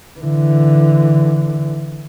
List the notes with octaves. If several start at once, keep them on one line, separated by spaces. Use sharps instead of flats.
D3 E3